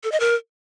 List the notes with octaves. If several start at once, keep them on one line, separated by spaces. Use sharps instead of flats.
A4
D#5
A#4